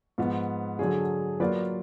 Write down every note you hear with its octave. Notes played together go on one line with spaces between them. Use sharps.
G#2 F3 B3
D3 F#3 D4 G#4
F#3 A#3 F4 B4 D5